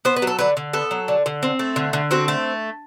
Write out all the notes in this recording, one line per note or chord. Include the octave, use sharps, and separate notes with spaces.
B3 C5
B4
F#3
A4
D3 B4
D3
B3 A4
F#3
D3
D3
C4
A3
D3
D3
C4 F#4
A3